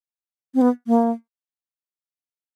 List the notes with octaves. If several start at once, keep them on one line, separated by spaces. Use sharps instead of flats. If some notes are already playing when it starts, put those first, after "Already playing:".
C4
B3
A#3